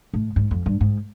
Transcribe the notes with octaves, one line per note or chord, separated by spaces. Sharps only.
A2
G#2
F2
G2
G#2